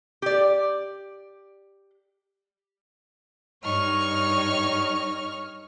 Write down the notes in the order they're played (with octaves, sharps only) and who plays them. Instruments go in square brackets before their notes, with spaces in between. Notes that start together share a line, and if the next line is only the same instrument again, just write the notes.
[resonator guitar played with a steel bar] G4 D5
[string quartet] G2 D#4 C#5 C#6 F6